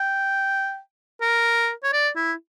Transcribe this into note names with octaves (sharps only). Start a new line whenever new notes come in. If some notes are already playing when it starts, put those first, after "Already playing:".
Already playing: G5
A#4
C#5
D5
E4